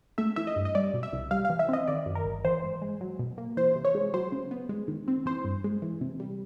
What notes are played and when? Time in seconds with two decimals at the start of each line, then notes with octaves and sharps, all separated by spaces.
0.18 A3 E5
0.36 E3 E5
0.47 D#5
0.56 G2
0.65 D#5
0.75 G3 D5
0.94 B2
1.03 E5
1.13 C2
1.31 G3 F5
1.45 F5
1.50 E3
1.59 E5
1.69 C4 D#5
1.88 D#3 D5
2.06 F#2
2.15 A#4
2.25 G1
2.44 E3 C5
2.63 G#2
2.82 G#3
3.01 F#3
3.19 B2
3.38 A#3
3.57 E3 C5
3.76 C3
3.85 C#5
3.95 G#3
4.14 F#3 C5
4.32 C#3
4.51 B3
4.69 G#3
4.88 D#3
5.08 C4
5.26 E3 C5
5.45 G2
5.64 G#3
5.82 E3
6.01 C3
6.20 G3